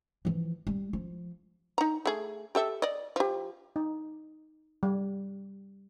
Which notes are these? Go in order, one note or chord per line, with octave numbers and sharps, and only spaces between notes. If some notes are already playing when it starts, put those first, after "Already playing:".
E3 F3
G3
F3
D#4 A#5
A3 G#4
G4 A4 E5
D5 D#5
F3 G4
D#4
G3